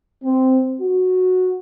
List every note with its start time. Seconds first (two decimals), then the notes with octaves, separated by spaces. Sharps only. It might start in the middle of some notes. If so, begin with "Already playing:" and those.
0.24 C4
0.81 F#4